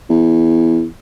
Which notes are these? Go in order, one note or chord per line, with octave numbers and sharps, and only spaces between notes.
E2